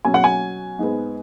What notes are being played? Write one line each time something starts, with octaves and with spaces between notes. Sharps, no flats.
B2 F#3 C#4 G#5
F#5
G#5
G#2 G#3 B3